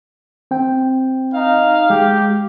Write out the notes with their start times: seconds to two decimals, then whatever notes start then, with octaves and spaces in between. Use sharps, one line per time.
0.51 C4 G5
1.34 D#4 F5
1.90 G#3 G4